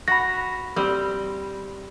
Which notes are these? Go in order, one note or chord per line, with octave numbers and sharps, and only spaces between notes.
F#4 B5 A#6
G3 C4